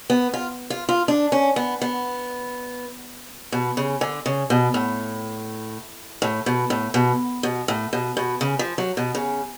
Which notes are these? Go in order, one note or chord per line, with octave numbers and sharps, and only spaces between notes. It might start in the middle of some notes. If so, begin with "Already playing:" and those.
B3
F4
F4
F4
D4
C#4
B3
B3
B2
C#3
D3
C#3
B2
A2
A2
B2
A2
B2
B2
A2
B2
B2
C#3
F3
F#3
B2
C#3